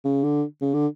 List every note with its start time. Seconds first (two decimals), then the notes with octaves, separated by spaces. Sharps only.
0.05 C#3
0.24 D3
0.61 C#3
0.74 D3